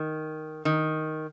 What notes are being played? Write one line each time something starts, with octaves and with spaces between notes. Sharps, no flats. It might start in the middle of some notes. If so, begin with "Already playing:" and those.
Already playing: D#3
D#3